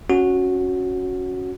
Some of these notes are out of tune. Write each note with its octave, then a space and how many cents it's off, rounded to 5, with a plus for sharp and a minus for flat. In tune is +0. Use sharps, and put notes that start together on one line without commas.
C#4 +0 F#4 -10